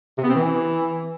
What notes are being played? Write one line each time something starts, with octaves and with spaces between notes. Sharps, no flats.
C3
B3
C4
E3